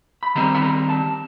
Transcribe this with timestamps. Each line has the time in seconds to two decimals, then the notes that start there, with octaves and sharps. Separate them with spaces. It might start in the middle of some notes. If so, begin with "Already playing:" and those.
0.23 B5
0.35 D#3 G3 C4 A#5
0.55 B5
0.62 A#5
0.89 A5